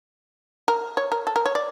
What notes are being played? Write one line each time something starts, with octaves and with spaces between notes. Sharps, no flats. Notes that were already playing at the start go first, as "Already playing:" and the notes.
A#4
C#5
A#4
A4
A#4
C#5
D5